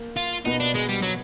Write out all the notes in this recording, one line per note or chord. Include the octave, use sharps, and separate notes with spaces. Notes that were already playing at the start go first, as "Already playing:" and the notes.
Already playing: A#3
F4
B2 B3 D#4
D4
G#3
G3
F#3